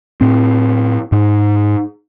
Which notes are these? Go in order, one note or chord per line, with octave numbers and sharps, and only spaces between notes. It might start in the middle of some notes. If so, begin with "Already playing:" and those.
A2 C4
G#2